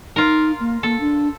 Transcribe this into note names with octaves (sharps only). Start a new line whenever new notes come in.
D#4 F4 A#4
A#3
A#3 A4
D4